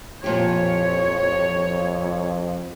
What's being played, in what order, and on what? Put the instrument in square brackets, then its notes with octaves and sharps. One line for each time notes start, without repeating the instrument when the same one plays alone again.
[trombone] F2 [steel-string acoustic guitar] A#2 F3 G4 [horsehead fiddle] C#5